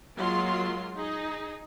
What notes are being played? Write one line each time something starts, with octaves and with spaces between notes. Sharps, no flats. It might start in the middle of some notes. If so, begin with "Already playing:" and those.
F#3 G#3 A#3 F4 C6
D#4 G#4